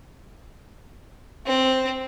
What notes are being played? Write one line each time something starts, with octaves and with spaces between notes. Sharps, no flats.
C4